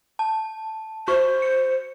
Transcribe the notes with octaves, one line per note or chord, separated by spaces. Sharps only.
A5
F#4 C5 C#6
C#7